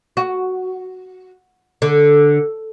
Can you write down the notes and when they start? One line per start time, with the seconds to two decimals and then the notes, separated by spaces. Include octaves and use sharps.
0.17 F#4
1.82 D3